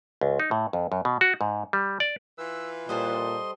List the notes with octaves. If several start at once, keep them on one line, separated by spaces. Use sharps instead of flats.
C#2
D#4
A2
F2
F#2
B2
F#4
G#2
G3
D5
E3 F4 B4 E6
A#2 G3 A4 C5 D#5 C6